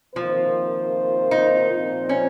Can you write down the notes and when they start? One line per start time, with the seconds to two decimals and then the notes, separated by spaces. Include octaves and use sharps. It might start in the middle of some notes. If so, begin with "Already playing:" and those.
0.15 C3 D#3 F3 A#3 F4 C5
1.31 D#4
1.71 A#2 F3 C4 F4
2.09 C#4